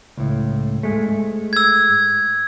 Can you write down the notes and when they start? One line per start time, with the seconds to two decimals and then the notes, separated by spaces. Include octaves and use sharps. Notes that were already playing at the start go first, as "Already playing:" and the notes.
0.17 C#2 A2
0.83 G#2 G#3 A3
1.53 E6 G#6